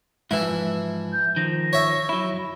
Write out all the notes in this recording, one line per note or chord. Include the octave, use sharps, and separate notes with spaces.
G#2 E3 F3 E4 E5
G6
D#3 F3 A#6
C#5 E5
F#3 E4